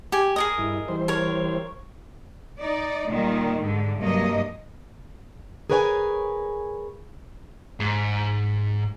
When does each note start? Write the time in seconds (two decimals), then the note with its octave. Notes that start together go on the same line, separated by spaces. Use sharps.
0.12 G4 G#5
0.36 G#4 A#4 D#5
0.58 G2 E4
0.88 E3 G3 C5
1.08 A#4 C#5
2.60 D#4 D5
3.09 A#2 D#3 G3
3.63 G#2 D3
4.00 G2 C3 F#3 A#3 D#5
5.70 G#4 A#4 B4 C#5 G5 G#5
7.80 G#2